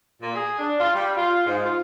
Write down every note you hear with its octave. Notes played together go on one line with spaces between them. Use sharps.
A#2
G#4
D4
F4
G3
F4
G#2
F4